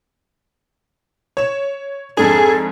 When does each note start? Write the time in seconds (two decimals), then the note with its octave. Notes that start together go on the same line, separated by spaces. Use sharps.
1.37 C#5 E7
2.17 F2 G#2 D4 G#4 A4